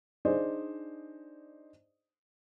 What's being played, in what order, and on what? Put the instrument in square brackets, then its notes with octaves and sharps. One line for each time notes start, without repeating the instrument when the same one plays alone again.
[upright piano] D4 D#4 G#4 C5 D5 D#5